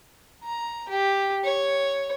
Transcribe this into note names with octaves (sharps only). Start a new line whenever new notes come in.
A#5
G4
C#5